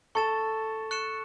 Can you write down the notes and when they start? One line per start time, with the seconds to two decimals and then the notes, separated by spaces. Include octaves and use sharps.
0.15 A4 C#6 A6 E7
0.91 C#6 F#6 C#7 E7